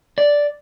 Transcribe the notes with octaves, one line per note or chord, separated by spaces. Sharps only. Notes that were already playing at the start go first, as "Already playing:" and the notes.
D5